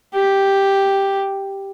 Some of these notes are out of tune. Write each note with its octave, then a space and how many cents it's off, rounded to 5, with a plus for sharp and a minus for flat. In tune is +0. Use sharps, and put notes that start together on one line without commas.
G4 +0